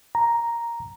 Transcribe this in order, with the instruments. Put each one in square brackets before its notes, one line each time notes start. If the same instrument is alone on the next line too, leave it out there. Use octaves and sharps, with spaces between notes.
[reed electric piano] A#5